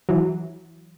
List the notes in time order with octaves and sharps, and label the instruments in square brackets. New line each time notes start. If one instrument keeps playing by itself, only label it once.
[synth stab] E3 F#3